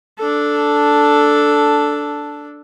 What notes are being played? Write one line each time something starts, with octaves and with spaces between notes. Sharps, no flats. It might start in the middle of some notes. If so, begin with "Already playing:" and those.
D4 A4